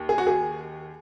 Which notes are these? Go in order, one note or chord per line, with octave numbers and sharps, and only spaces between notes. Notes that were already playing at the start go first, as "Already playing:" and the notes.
Already playing: D#2
G#4
F#4
G#4